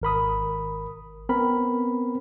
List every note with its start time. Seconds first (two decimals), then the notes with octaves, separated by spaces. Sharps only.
0.02 G#1 A#4 B5 D#6
1.29 B3 C4 A#4 B5